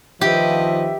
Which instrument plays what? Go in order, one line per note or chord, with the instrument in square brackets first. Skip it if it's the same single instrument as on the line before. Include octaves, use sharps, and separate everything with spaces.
[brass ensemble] D#3 F3 [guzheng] G4 [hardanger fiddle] B4 D#5 [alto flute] E5